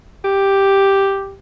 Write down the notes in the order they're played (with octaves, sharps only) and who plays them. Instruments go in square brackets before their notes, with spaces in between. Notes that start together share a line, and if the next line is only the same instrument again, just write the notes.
[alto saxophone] G4